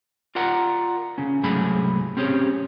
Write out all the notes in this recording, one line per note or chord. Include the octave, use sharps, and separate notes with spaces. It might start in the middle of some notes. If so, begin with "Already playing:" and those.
F4 A#4 D5 F#5 A#5
C#3 C#4
C2 G#2 F#3 A3 G#4 B5
C4 C#4 G4 G#4 C#5